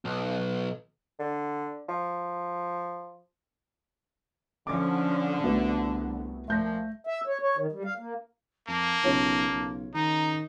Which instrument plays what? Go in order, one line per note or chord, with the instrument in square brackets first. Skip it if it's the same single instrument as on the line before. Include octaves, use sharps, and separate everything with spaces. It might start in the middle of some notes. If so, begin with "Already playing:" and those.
[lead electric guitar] B1
[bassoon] D3
F3
[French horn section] D3 [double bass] F3 C#4 [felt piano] D6
[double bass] C2 [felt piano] A3 B3 F#4
[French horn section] A#2 F3 [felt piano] A3 G6 A#6
[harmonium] E5
C#5
C#5
D#3
G3
F5
A#3
[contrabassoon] F2 [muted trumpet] A#3 [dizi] A5
[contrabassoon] B1 [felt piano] C#3 F4 C#5
[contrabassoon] B1
[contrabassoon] D#3 [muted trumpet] D#4 [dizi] A#5